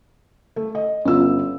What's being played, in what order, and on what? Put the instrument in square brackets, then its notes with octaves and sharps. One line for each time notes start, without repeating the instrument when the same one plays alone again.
[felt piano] A3
D#5
[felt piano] G1 B3 E6 [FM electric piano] C#4 F4